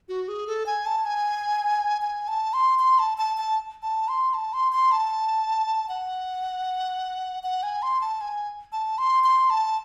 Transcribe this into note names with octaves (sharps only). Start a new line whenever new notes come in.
F#4
G#4
A4
G#5
A5
G#5
G#5
A5
C6
C6
A5
A5
A5
A5
C6
A5
C6
C6
A5
F#5
F#5
G#5
C6
A5
G#5
A5
C6
C6
A5